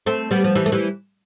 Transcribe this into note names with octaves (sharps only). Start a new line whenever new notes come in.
A3 C4
G3 B3
F3
E3 G3
A3
E3 G3